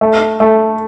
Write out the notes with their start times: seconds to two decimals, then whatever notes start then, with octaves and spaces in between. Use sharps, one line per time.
0.01 A3
0.40 A3